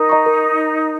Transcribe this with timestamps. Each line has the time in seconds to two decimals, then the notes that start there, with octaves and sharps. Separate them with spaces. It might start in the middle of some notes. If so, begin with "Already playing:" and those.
Already playing: D#4 A#4
0.09 D#5 A#5 C#6
0.26 A#4